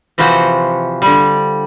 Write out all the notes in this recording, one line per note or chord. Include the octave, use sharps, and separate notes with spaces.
C3 E3 F3 F4 F#4 C5
D3 G3